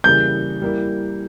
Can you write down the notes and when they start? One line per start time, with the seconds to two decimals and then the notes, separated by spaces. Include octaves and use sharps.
0.04 C#3 E3 G3 A#3 G6
0.62 G3 A#3 E4